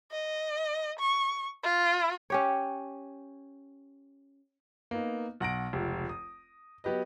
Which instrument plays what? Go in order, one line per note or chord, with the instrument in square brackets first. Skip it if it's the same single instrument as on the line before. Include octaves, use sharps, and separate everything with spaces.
[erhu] D#5
C#6
F4
[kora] C#4 G4 C#5
[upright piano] A#3 B3 D#4
B1 F#5 A#6 D7
F1 C#2
D#6
F#3 B3 G4 B4 D#5